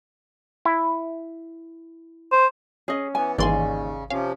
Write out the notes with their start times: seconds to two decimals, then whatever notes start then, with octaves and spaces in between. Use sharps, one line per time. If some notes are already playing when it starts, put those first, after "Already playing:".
0.65 E4
2.32 C5
2.88 C#4 G#4 D#5
3.15 E3 B3 G#5
3.38 G#1 D#2 C#3 E3 D5 G#5 C6
4.10 C3 F3 C#4 F5